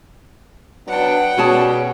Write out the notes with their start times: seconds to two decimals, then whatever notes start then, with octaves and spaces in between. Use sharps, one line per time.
0.87 F#3 B3 D4 F#5 G5
1.37 B2 G3 C#4 F#4 G#4 C#5 A5